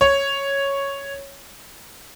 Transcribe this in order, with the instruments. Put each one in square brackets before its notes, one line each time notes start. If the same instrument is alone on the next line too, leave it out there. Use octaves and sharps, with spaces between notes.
[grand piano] C#5